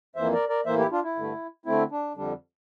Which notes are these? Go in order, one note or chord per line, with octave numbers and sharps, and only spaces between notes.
F2 E3 A#3 C5 E5
A#4 D5
A#4 D5
A2 E3 A#3 C5 E5
E4 G4
D4 F4
E4
G2 D3 A3
D3 A3 C4 E4
D4
F2 D3 G3 D4